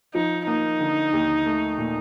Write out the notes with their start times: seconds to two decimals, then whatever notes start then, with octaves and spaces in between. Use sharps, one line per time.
0.14 F3 D#4
0.47 A#3 D#4
0.80 D3
1.13 D#2
1.46 A3
1.78 A#2